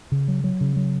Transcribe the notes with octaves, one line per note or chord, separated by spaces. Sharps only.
C#3
F#3
F#3
C#3
F#3